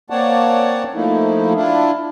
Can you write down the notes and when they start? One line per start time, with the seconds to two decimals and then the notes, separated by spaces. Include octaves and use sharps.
0.10 A#3 C4 C#5 D5 F#5 A5
0.94 F3 A3 A#3 D#4 E4
1.55 D4 E4 F4